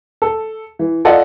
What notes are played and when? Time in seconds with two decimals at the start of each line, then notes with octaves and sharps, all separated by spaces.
0.22 A4
0.79 E3
1.05 F4 A4 D5 D#5 F#5